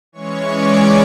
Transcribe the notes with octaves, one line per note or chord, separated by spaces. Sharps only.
E3 G#3 C#4 C#5 C#6
D5 D6